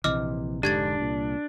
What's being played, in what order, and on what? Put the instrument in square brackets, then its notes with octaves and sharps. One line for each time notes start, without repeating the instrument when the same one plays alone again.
[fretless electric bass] A#1 C3 E3 [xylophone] D#5 D6 F6
[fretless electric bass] F1 G#2 D3 [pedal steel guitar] D4 [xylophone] G4 G#6 A6
[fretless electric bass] C2 A#2